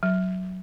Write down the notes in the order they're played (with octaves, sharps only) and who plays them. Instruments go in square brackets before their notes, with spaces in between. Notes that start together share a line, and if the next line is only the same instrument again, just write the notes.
[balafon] F#3